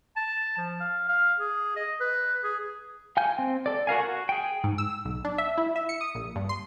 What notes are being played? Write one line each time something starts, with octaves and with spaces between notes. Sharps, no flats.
A5
F3
F5
F5
G#4
D#5
B4
G#4
F5 G5 G#5 G6
C4
A4 D5
F#4 A#4 F5 G#5
F#4
G#4 G5
G#2
E6
B1
D4
E5
E4
E5
C#7
D#6
A#1
G2
C6